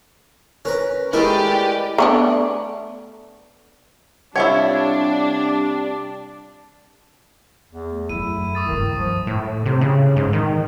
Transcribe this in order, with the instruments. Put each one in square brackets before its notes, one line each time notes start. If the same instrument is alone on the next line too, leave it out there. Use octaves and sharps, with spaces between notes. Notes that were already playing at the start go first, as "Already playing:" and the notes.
[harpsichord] C#4 B4 A#5 [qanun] A#4
[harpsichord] G#3 A3 A#4 [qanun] E4 G#4 [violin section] G4 B4 D5
[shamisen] A3 B3 D4
[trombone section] C3 G3 [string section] D4 [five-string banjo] E4 F4 C#5 [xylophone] F#5 G#6
[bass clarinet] E2
[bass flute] A3
[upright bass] F#2 [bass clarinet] E4 [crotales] D#7
[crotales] C#6 D#6 A6
[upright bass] C#2 G2 [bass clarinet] D#3
[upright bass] G2 [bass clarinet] F3
[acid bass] A2
C3
C#3
G#2
D#3